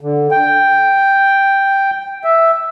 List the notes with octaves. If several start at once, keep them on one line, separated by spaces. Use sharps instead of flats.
D3
G5
E5